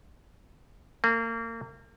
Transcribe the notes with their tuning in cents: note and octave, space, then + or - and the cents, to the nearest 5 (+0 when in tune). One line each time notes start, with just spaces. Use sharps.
A#3 -30